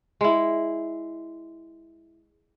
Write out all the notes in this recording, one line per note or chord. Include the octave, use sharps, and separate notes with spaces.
G#3 E4